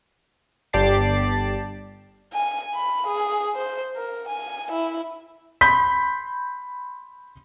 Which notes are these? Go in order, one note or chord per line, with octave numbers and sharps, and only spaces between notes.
G1 G4 D5 A5 C7
G#5
B5
G#4
C5
A#4
G#5
E4
B5 C6 G6 B6